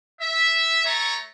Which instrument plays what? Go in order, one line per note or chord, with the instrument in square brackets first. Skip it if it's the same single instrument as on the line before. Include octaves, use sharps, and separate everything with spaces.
[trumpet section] E5
A3 C#5 A#5 C#6